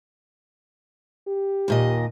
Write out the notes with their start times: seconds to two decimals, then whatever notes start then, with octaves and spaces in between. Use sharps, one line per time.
1.27 G4
1.68 D#2 A#2 D#5